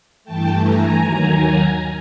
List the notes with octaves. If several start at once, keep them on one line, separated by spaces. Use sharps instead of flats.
G2 E3 A3 G5 A5
G#5 A#5
D#2 D#3 F#3